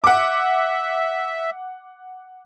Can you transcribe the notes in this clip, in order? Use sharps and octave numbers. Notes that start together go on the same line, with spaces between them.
E5 F#5 D6